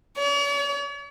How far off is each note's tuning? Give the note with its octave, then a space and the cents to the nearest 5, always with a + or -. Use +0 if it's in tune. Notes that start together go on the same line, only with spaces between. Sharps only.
C#5 +45